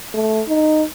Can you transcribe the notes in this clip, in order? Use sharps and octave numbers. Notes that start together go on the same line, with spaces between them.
A3
D#4